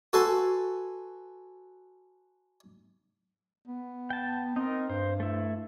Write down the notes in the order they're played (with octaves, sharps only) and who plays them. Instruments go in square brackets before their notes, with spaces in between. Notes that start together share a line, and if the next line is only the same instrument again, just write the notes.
[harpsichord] F#4 A4 B4 G#5 C6
[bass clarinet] B3
[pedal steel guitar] G5 A5
[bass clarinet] C4 [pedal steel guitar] D#4 A#4
[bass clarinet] G2 [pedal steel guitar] C5
[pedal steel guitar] A3 E4